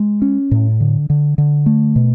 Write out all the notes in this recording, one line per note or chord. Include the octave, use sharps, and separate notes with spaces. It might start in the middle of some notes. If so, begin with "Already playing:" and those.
Already playing: G#3
C#4
A2
D3
D3
D3
A3
B2